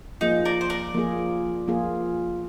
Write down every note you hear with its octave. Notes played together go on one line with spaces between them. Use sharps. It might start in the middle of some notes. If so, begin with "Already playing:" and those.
F3 A#3 D#4 F4 G#4
A#4 D5
C5
A#4 D5
F3 A#3 F4 G#4
F3 A#3 F4 G#4